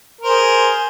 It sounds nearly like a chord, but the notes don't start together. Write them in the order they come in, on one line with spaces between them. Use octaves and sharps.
A#4 C5 G#4